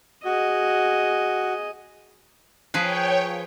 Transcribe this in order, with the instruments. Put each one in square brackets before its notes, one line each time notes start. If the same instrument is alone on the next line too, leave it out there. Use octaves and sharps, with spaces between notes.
[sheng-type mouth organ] F#4 [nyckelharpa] G#4 D#5
[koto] F3 G#4 B4 [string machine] C#5 G5